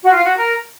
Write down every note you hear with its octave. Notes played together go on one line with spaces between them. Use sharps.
F#4
F4
F#4
A#4